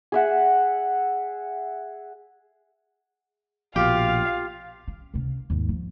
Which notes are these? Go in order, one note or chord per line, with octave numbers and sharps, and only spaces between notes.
G#4 E5 F#5
A#1 B2 F4 G4 F5
C#4
C#2 C3
D#2 G#2
F3